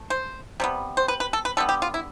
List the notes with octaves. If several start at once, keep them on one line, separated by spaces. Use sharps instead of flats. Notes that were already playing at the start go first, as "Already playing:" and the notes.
Already playing: A3
C5
C3 G3 B3
C5
B4
B4
A4
B4
D3 G3 B3 A4
G4
F4
E4